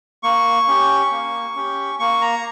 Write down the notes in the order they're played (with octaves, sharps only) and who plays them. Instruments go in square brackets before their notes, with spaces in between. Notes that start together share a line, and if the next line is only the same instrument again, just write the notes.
[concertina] A#3 C#6
C#4 G4
A#3
C#4 G4
A#3 C#6
A#5